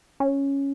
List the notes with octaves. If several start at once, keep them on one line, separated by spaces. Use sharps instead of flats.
C#4